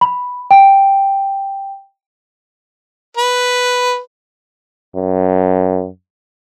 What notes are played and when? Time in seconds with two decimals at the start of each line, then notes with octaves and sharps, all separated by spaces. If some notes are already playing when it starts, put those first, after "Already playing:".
0.01 B5
0.51 G5
3.17 B4
4.95 F#2